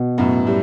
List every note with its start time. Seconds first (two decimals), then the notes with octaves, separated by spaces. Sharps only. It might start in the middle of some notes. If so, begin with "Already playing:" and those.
Already playing: B2
0.18 F#2 A2 B3
0.47 A2 G3